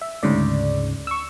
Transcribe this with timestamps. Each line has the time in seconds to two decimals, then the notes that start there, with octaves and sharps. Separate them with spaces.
0.01 E5
0.23 D2 G#2 C#3 D5
1.07 C#6 E6